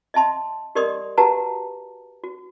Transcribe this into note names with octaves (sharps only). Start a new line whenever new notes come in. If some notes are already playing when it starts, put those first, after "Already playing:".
D#5 E5 A5 C6
G4 A#4 D5 D#5 C6 D#6
F#4 G4 B4 F#5 A5 A#5
F#4